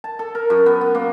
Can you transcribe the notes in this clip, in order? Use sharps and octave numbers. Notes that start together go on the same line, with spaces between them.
A5
A4
A#4
F#2
B3
B3
A#3